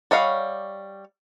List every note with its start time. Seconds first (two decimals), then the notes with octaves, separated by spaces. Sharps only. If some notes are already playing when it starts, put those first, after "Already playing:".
0.11 G3 C#5 D#5 F5 F#5